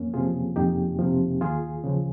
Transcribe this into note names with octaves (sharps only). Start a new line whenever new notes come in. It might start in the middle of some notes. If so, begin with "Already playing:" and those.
Already playing: F2 A#3 C#4
C3 F3 F4 G#4
F2 D#4 G4
C3 F3
D#2 F4 G#4
C#3 F3